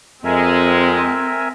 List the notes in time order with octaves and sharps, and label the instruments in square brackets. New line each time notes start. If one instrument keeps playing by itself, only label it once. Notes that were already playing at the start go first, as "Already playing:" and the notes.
[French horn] F2 [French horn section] G#3 [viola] C4 [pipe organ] A#4 E5 G#5